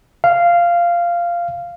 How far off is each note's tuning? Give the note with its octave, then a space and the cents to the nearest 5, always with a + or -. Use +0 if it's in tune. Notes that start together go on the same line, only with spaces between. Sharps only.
F5 -10